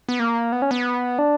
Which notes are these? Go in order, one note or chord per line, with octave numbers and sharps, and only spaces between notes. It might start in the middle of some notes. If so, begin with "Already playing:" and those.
B3
A#3
B3
C#4
B3
D4